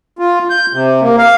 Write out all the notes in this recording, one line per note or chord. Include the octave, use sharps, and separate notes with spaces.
F4
G6
C3
A#3
F5